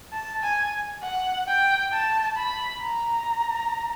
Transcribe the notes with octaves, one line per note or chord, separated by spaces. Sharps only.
A5
G#5
F#5
G5
A5
B5
A#5